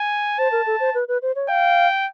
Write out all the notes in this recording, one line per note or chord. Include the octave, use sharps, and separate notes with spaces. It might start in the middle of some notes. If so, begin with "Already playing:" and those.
Already playing: G#5
C5 A5
A#4
A4
C5
B4
B4
C5
C#5
F5 G5